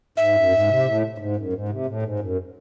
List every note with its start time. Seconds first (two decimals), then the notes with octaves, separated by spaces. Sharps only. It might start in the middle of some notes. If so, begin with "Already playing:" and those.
0.17 G#2 E5
0.35 F#2
0.51 G#2
0.68 C3
0.85 A2
1.18 G#2
1.36 F#2
1.53 G#2
1.69 C3
1.86 A2
2.02 G#2
2.20 F#2